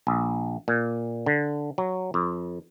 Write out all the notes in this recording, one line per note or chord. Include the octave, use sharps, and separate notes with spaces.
A#1
A#2
D3
F#3
F2